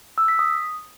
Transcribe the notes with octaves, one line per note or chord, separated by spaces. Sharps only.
E6
B6
D#6